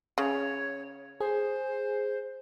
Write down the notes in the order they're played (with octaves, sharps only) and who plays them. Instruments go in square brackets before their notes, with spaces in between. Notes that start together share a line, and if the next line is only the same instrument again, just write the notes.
[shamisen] C#3 [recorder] C#5
[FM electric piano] G#4 [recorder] C5